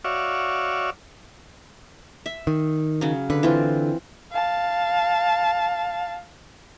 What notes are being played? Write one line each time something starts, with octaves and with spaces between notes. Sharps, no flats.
F#4 C#5 D5 E5 F5
E5
D#3
C#3 F#3
D3 B4
E3 C4 F4
F5 A5